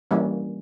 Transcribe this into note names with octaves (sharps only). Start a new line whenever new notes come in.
E3 G3 A#3 C#4